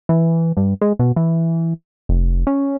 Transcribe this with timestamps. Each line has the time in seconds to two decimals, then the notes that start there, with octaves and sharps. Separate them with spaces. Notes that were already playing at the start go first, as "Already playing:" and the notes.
0.09 E3
0.57 G2
0.81 G#3
0.99 B2
1.16 E3
2.09 F1
2.47 C#4